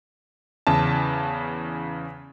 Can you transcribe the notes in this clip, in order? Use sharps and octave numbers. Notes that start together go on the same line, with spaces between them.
E2 C#3 E4 A5